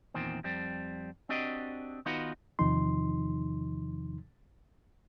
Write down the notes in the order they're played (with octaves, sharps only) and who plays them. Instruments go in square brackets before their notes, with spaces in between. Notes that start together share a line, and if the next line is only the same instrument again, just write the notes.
[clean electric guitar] E2 A#2 D#3 C4
F2 G3 C4
C4 D4 F#4 G4 D#5
D#3 B3 D#4 F4 F#4 B4
[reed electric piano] E2 C3 D#3 F3 D#4 C6